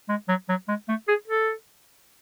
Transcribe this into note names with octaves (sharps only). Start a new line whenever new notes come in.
G#3
F#3
F#3
G#3
A3
G#4
A4